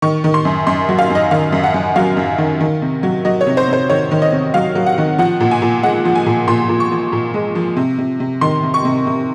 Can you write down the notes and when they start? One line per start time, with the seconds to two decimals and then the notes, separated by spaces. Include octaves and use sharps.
0.02 D#3 C#6
0.24 D#3
0.34 C6
0.45 F#2
0.67 F#2 C6
0.89 F#3
0.99 F5
1.10 F#2 D#5
1.31 D#3 F5
1.52 F#2
1.64 F#5
1.74 F#2
1.96 F#3 F5
2.17 F#2
2.38 D#3
2.61 D#3
2.82 C3
3.03 F#3
3.25 F#3 D#5
3.41 C#5
3.46 C3
3.57 C5
3.68 C3 C5
3.89 D#3 C#5
4.11 D#3
4.22 D#5
4.32 C3
4.54 F#3 F5
4.75 F#3
4.86 F#5
4.98 D#3
5.18 F3 F#5
5.40 A#2
5.51 G#5
5.62 A#2
5.83 G#3 F#5
6.05 F3
6.15 G#5
6.26 A#2
6.48 A#2 C6
6.69 A#2
6.80 C#6
6.91 F3
7.12 A#2
7.34 G#3
7.55 F3
7.76 C3
7.98 C3
8.20 C3
8.41 D#3 C6
8.63 C3
8.74 C#6
8.85 C3
9.07 C3